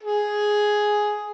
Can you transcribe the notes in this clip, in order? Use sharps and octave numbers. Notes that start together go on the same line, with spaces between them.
G#4